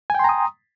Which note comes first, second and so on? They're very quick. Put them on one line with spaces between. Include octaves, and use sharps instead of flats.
G#5 G5 C6 A#5 D#6